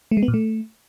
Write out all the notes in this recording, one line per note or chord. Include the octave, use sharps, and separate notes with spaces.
A3
G#3
B3
A#2
A3